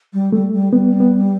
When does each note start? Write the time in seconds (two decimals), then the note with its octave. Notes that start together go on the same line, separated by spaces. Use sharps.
0.13 G3
0.32 G3 A3
0.53 G3
0.72 G3 B3
1.00 B3